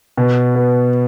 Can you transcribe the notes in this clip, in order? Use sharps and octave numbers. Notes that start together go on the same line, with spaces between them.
B2
B3